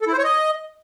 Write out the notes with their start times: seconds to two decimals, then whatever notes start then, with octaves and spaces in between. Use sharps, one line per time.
0.01 A4
0.07 E4
0.13 C5
0.18 C#5
0.24 D#5